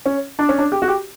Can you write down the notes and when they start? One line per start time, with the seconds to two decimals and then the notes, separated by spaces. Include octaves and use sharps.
0.06 C#4
0.39 D4
0.49 C#4
0.58 D4
0.72 G4
0.82 F#4
0.88 G4